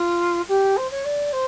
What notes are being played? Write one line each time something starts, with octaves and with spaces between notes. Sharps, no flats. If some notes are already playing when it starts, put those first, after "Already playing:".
Already playing: F4
G4
C5
C#5
D5
C5